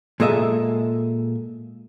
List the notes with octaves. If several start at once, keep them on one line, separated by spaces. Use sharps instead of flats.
A#2 G#3 A4 D#5 E5